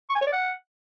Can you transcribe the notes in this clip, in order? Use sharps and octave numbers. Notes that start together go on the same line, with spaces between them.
C#6
G#5
C#5
D5
F#5